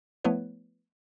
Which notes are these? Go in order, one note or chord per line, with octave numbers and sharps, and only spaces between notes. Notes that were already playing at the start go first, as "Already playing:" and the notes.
F3 A3 B3 E4 B4 C#5